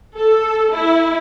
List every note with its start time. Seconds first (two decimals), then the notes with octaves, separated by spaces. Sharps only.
0.17 A4
0.74 E4